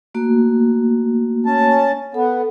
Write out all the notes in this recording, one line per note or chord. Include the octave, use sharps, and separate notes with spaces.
A3 A#3 F#4
C#4 A5
B3 A4